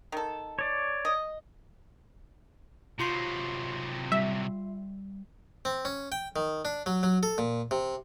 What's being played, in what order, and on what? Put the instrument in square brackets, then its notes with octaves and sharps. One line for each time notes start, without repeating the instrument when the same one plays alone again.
[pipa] D#3 A4
[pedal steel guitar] C#5 D5
[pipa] D#5
[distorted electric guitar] C3 F#3 [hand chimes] F4 C6 C7
[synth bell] G3 [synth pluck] E5
[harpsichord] C4
C#4
G5
D#3
D4
F#3
F#3
A4
A#2
C3